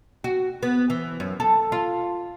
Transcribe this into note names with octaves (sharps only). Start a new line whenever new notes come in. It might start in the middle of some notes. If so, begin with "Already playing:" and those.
F#4
B3
E3
F#2
A4
F4